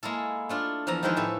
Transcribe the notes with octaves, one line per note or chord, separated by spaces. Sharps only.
G#3 A#3 E4 A4
A3 D4 F4
E2 F3 A4 A#5
D#3 F3 G#3 E4 G4 B4
A2 A4 E5